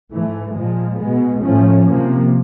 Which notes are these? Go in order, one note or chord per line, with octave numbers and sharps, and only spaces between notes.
G#2 E3 A3
A#2 F3 G#3
B2 G#3 B3
A2 F3 A3 C#4
C3 F3 A#3